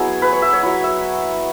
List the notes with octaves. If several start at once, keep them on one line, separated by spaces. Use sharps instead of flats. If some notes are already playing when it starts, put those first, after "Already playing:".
Already playing: F#3 B3 E4 G#4 F#5
B4
C#5
E5
C#5
F#3 E4
E5